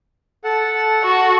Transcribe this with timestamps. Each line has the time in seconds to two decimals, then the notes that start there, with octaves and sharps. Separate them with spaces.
0.44 A4 F#5 A5
1.04 F#4